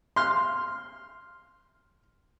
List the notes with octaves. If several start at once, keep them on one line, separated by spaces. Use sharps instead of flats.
C6 F6